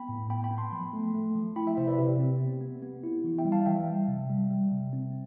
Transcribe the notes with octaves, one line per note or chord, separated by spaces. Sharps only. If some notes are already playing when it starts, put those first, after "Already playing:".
Already playing: B3 G5 B5
A2
B3 G5 B5
G5 B5
B3
A5 C6
F3
A3
A3
F3
E4 G5 B5
E5 G5
C3 C5 E5
B4 D5
C3 G4
C4
B3
B3
B3
E4
E3
E5 G5
G3
F5 A5
E3 E5 G5
G3
C3
G3
G3
C3
C4